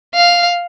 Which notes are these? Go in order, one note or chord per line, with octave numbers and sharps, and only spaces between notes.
F5